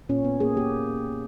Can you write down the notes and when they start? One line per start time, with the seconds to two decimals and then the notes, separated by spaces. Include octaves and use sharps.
0.09 A#2 C#4
0.25 B3
0.40 A#3 G#4
0.56 A#3 G4